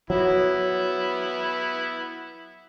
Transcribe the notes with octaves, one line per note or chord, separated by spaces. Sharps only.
F#3 B3 E4